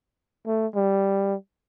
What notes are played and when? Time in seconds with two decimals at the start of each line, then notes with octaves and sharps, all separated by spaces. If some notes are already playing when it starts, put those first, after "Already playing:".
0.47 A3
0.75 G3